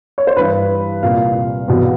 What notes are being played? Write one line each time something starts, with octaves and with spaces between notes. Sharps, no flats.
C#5
C5
G2 E3 B4
C2 A#2 F5
E2 B2